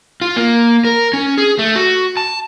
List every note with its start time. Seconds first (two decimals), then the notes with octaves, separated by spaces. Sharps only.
0.21 F4
0.36 A#3
0.85 A#4
1.13 C#4
1.38 G#4
1.59 A3
1.76 F#4
2.17 A5